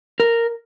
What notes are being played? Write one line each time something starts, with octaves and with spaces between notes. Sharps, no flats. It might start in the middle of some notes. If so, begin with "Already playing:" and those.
A#4